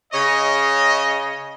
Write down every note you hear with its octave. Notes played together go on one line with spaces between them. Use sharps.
C#3 C#5 D#5